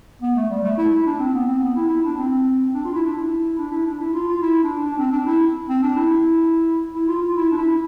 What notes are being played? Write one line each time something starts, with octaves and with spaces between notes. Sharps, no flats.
B3
A3
G3
A3
E4
E4
D4
C4
B3
C4
B3
E4
E4
D4
C4
D4
F4
E4
D4
E4
D4
E4
D4
E4
F4
F4
E4
D4
D4
C4
D4
E4
C4
D4
E4
E4
F4
F4
E4
D4
E4